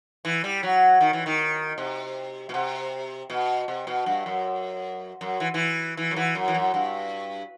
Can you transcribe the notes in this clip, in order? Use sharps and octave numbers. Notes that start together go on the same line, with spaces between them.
E3
G3
F#3
D#3
E3
D#3
C3
B2
C3
B2
C3
B2
G2
F#2
F#2
E3
E3
E3
F#2
E3
F#2
E3
F#2
G2